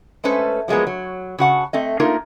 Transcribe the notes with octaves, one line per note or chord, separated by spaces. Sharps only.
G#3 A3 C#4 A4 B4 C5
F3 F#3 G#3 A#3 B3
F#3
C#3 F#4 F#5 A5
A3 C4 D#5
A3 A#3 D#4 F4 A#4